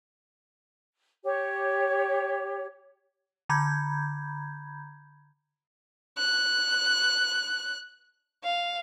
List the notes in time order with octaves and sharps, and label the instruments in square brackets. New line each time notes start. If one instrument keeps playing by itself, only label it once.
[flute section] G4 C#5
[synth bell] D3 A#5 B5 G6 G#6
[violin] F#6
F5